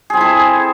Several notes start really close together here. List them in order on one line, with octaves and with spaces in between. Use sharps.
G#4 C4 E4 A4